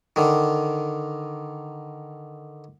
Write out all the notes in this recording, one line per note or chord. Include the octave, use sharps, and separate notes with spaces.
D3 D#3